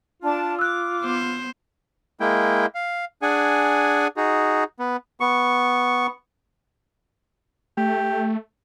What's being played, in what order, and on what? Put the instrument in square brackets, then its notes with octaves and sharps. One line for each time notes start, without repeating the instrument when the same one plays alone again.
[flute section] D4 A5 [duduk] F4
[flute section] D6 [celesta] E6 F#6
[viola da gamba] B3 C5
[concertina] G#3 A#3 E4 G5
F5
D4 G#4 F#5 G#5
D#4 F#4 G#4
B3
B3 C#6
[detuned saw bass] A3 [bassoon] G4